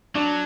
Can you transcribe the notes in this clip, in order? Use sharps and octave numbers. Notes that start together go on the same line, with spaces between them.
F#3 D4